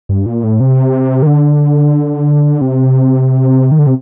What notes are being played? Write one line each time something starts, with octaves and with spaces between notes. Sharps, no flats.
G2
A#2
A2
C3
D#3
D3
C3
D#3
D3
C3